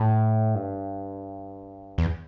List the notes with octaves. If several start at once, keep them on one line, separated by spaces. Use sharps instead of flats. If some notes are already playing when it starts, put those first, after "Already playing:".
Already playing: A2
G2
E2